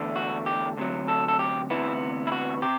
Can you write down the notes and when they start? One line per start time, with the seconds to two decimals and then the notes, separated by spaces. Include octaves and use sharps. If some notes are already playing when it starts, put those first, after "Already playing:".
Already playing: E2 D3 A3 D4
0.16 F#4
0.46 G4
0.77 D2 C3 F#3
1.08 A4
1.28 A4
1.39 G4
1.70 D2 C3 E3 B3 E4
2.27 E4
2.32 F#4
2.62 C3 G4